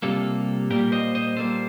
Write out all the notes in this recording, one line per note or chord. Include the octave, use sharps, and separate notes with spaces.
C3 G3 A#3 F4 A4
A#2 G3 A#3 G4 A#4
C5 D#5
C5 D#5
A#2 G3 A#3 A4 C5